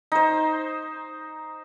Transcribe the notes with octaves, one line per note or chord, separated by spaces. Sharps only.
D#4 C5